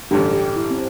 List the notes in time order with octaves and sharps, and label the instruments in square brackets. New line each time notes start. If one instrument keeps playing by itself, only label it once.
[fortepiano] A1 G2 D3 [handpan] G4
[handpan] G4
E4
C4